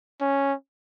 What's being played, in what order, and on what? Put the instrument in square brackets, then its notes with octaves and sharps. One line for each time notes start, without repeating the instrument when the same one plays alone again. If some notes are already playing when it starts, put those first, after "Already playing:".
[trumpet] C#4